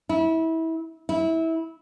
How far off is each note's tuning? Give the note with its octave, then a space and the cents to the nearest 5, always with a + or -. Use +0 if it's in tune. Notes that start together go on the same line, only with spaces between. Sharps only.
E4 -25
E4 -20